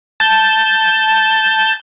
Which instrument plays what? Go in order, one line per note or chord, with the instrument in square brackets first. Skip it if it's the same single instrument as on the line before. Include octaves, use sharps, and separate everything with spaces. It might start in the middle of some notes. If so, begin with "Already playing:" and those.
[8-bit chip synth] A5 G6